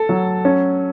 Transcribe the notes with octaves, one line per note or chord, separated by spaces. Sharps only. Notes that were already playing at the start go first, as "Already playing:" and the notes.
Already playing: A4
F#3
C#4